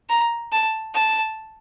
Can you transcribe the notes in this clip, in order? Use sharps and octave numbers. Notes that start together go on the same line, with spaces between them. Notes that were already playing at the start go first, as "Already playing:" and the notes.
A#5
A5
A5